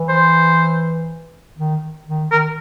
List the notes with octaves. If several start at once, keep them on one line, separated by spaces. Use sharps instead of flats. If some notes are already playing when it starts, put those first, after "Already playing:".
Already playing: E3
C5
D#3
D#3
D#3 A#4